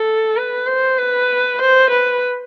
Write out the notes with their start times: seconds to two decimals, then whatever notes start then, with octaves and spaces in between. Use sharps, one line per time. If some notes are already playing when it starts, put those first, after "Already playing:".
Already playing: A4
0.37 B4
0.67 C5
0.98 B4
1.59 C5
1.91 B4